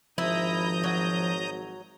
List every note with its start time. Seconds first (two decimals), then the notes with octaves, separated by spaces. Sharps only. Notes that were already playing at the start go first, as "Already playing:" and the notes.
0.18 G#1 F3 E4 A#5 D#6 G6
0.84 F#3